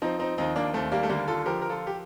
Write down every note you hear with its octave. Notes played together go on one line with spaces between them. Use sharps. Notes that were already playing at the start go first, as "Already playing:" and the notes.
F3 C4 D#4
C4 D#4
D#2 C4 D#4
A#3 D4
D#2 A3 C4
G3 A#3
A3
D3 G3 A#3
F4 A4
F3 G4 A#4
A#4
F4 A4
G4